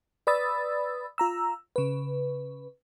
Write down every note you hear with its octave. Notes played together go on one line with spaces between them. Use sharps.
B4 D5 B5 D#6 E6 A6
F4 A#5 E6
C#3 B4